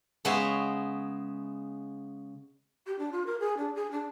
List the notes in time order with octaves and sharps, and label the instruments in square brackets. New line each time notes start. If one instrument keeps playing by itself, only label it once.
[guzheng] C#3 G#3 B3 G#4 C#5 E5
[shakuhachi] G4
D4
F4
A#4
G#4
D4
G#4
D4